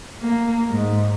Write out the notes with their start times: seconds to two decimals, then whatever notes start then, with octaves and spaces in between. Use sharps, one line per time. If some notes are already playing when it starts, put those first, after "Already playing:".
0.20 A#3
0.70 G#2